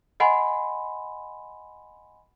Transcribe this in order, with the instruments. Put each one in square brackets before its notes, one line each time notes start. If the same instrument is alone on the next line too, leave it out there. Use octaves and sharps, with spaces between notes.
[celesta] D#5 F#5 G#5 B5 C6